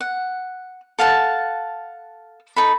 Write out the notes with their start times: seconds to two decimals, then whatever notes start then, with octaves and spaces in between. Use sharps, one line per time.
0.01 F#5
0.99 A4 F5 F#5 A5
2.56 D#4 A4 B5